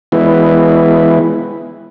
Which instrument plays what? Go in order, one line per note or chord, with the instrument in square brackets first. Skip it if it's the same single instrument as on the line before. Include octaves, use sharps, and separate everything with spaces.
[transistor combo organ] E3 G#3 B3 E4